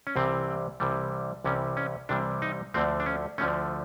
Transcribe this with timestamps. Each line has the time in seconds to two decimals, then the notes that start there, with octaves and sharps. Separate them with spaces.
0.07 C#4
0.16 C2 C3 E3 G3 C4
0.80 C2 C3 E3 G3
1.44 C2 C3 E3 G3 C#4
1.77 C#4
2.09 C2 C3 E3 G3 D4
2.42 D#4
2.74 D2 D3 F3 A3 C4
3.00 D4
3.06 C#4
3.38 D2 D3 F3 A3 C#4